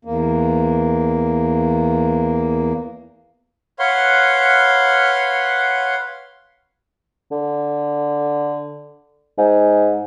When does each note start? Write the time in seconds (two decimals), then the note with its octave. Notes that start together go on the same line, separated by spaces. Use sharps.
0.05 E2 A#3
3.79 B4 C#5 F5 F#5 C6
7.31 D3
9.38 G#2